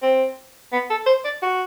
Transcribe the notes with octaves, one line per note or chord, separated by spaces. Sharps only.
C4
B3
A4
C5
D5
F#4